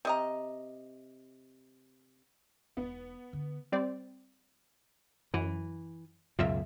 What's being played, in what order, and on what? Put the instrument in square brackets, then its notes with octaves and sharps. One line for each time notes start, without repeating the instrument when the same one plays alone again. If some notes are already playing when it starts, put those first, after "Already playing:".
[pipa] C3 D#5 A#5
[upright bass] E1 D#4 [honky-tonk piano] B3
[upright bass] D3
[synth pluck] G3 C4 D5
[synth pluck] F#2 [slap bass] E3
[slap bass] C#2 F#2 B2 [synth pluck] F4 E5